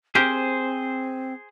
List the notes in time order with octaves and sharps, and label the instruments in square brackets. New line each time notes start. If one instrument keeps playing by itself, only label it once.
[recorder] C4 [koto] G4 A#4 [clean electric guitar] G#4 C5